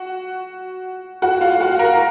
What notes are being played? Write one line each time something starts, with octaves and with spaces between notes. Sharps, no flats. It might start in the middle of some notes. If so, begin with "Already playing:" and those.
Already playing: F#4 F#5
F#4 F#5
F4 F5
F#4 F#5
A#4 A#5